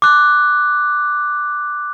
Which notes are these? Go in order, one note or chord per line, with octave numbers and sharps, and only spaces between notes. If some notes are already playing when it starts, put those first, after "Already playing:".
D6 F#6